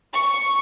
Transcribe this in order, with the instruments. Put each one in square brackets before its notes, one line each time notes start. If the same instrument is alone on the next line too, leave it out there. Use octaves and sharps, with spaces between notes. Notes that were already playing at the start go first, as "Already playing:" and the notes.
[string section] C#6